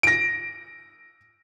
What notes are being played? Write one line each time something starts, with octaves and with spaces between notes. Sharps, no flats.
A#6 D7